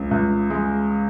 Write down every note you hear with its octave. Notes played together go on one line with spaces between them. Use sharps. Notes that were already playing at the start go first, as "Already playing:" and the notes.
Already playing: C#2 C#3
C#2
G#3